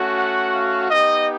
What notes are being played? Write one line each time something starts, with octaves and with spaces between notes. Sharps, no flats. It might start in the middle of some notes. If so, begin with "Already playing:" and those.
Already playing: A3 C#4 F#4
F#5
F5
B3 D#4 G4 D#5